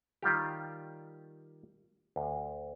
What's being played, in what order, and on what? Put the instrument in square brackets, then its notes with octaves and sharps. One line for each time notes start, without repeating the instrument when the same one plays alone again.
[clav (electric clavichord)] D#3 G3 F4 G4
D2